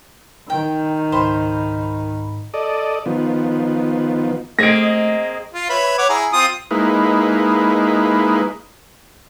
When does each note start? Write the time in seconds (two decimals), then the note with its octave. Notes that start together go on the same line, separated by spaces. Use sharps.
0.50 D#3 G5
1.12 C#2 G#2 C5 B5
2.54 A4 D5 D#5
3.06 D#3 F3 B3
4.59 A3 A#3 C4 G#4 D#5 A#6 D7
5.54 F4
5.69 B4 C#5 E5
5.98 C#5 F#5 D6
6.09 E4 G#4 A#5
6.33 C4 F4 D#6
6.71 G#3 A#3 D#4 E4 B4